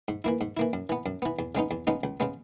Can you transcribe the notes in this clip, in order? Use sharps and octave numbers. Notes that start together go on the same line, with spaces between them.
G#2
E3 A#3 E4
G#2
E3 A#3 E4
F#2
E3 B3
F#2
E3 B3
E2
C#3 G#3 B3 D#4
E2
C#3 G#3 B3 D#4
C#2
C#3 G#3 B3